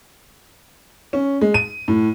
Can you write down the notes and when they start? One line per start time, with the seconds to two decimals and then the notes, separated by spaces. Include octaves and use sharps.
1.13 C#4
1.41 G#3
1.54 D#7
1.88 A2